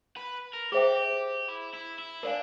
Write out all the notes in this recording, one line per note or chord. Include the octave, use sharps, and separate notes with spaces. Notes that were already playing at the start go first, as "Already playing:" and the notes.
B4
A#4
G4 G#4 C5 E5 G5
E4
E4
E4
D4 A#4 D5 F5 G#5